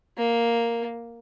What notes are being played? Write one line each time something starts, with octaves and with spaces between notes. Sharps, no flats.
A#3